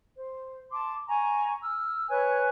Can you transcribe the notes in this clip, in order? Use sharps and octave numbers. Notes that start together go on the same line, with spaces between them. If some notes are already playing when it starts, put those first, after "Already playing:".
C5
A5 C6 D6
G#5 A#5 C#6
E6 F6
B4 C#5 G#5 F#6